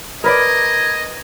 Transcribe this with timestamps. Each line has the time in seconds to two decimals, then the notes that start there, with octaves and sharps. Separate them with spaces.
0.24 A#4 B4 D5 D#5 G#6